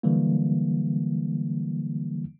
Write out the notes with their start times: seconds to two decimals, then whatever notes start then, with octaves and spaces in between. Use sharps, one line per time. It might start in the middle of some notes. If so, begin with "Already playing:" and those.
0.03 D3 E3 F#3 G3 A#3